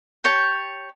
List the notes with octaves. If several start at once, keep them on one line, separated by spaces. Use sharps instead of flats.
G4 C#5 G5 A5